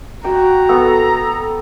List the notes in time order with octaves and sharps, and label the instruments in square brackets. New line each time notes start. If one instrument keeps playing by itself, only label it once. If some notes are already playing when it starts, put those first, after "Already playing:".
[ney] F#4 [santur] G5 [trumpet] A#5
[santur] B3 [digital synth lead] A4